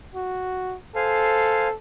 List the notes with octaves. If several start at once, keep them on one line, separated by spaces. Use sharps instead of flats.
F#4
A4 C5 F5 G#5